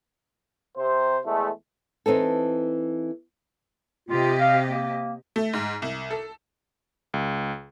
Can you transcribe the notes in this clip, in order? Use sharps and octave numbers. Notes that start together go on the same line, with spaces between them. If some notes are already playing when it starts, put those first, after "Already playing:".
C3 C5
E2 G#3 A3
E3 C4 D#4 A4
C3 F4 G4 D#5
F5
A#3
A3
G#2
C2
A4
C#2